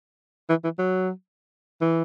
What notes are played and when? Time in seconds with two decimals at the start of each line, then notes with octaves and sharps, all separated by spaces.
0.49 E3
0.64 E3
0.79 F#3
1.81 E3